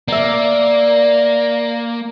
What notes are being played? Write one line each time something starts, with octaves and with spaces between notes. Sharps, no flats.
A#3 D5 E5